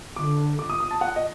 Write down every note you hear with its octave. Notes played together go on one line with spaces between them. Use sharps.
D3 D6
D6
D#6
D#6
A5
F#5
D#5